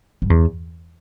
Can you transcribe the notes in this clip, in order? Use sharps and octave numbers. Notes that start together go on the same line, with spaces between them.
G2
E2